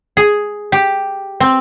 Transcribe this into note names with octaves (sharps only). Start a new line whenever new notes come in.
G#4
G4
C4